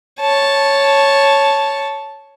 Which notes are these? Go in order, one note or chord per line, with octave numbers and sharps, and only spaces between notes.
C#5 A5